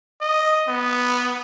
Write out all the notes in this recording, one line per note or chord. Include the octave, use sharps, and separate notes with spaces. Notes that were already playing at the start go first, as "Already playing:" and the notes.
D#5
B3